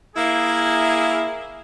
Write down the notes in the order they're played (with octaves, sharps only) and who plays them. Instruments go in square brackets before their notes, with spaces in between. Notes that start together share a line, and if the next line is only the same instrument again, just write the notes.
[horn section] A#3 E4 G#4